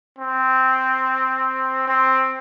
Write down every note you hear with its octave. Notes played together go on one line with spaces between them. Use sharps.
C4
C4